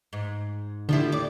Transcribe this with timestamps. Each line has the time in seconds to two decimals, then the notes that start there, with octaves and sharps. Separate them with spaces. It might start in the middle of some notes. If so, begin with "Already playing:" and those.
0.13 G#2
0.89 D3 F3 G3 E4
1.12 D#2 D5